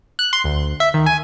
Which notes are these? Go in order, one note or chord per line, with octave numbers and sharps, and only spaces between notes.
F#6
C6
D2
E5
D#3
G#5